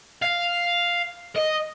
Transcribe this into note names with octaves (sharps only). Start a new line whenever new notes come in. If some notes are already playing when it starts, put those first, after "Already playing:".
F5
D#5